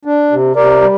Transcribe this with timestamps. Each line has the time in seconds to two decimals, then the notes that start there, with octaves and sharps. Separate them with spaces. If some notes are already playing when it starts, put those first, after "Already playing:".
0.05 D4
0.31 C3
0.56 C3 A#4 D5
0.81 G3